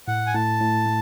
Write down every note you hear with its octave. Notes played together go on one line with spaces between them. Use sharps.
A2 F#5
G#5
A2 A5
A2
A3